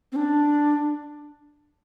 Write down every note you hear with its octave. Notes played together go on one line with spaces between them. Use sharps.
C4
D4